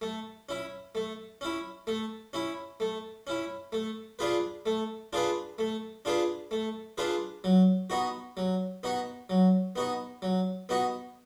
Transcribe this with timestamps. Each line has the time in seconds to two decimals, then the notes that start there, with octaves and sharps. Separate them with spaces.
0.01 A3
0.49 C#4 E4
0.95 A3
1.41 C#4 E4
1.87 A3
2.33 C#4 E4
2.80 A3
3.27 C#4 E4
3.72 A3
4.19 D4 F4 G#4 B4
4.66 A3
5.13 D4 F4 G#4 B4
5.58 A3
6.05 D4 F4 G#4 B4
6.51 A3
6.98 D4 F4 G#4 B4
7.44 F#3
7.90 B3 D#4 F#4
8.37 F#3
8.83 B3 D#4 F#4
9.30 F#3
9.76 B3 D#4 F#4
10.22 F#3
10.69 B3 D#4 F#4